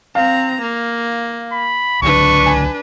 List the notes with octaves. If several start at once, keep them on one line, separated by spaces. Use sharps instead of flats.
C4 F5 A#5
A#3
B5
C#2 D3 F#3 D4 B4 C#6
G#5